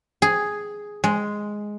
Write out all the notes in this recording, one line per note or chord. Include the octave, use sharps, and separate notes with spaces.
G#4
G#3